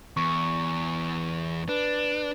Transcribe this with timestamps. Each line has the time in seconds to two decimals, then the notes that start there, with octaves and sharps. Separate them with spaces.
0.17 E2 C#6
1.69 D4 B4